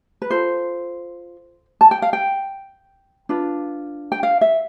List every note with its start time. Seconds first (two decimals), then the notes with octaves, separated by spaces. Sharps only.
0.22 B4
0.31 F4 A4 C5
1.81 A5
1.91 G5
2.02 F5
2.13 G5
3.29 D4 F4 B4
4.12 G5
4.23 F5
4.41 E5